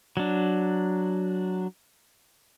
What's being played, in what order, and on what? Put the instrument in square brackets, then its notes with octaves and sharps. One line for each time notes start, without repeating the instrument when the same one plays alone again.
[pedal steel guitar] F#3 D4